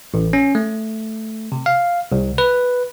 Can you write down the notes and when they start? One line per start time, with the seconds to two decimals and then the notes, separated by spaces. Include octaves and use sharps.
0.14 A1
0.33 C#4
0.55 A3
1.52 C3
1.66 F5
2.12 C2
2.38 B4